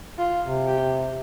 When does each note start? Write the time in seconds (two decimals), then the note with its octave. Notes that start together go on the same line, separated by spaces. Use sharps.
0.18 F4
0.43 C3
0.67 G4